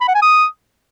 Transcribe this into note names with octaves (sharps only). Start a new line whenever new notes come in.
B5
F#5
G#5
D#6